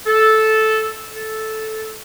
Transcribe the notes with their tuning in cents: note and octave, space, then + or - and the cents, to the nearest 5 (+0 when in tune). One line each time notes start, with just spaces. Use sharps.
A4 -10
A4 -10